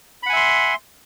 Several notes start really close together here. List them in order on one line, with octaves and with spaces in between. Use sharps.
B5 F#5 G#5 E5 C6